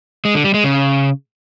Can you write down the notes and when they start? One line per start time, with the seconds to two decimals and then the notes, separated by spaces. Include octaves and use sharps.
0.25 G#3
0.35 D3
0.44 G3
0.54 G#3
0.64 C#3